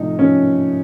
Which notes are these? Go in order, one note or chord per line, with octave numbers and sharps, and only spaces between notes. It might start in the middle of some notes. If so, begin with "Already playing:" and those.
Already playing: A2 C3 F3 D#4
F3 C#4